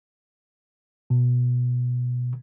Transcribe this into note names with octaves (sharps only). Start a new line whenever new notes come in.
B2